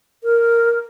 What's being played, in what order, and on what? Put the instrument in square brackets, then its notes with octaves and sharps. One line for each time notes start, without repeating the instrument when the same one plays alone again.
[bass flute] A#4